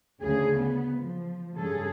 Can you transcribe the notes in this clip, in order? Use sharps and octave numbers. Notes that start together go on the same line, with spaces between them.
D2 C#3 G#4
B3
F3
G2 C#3 G#4 A4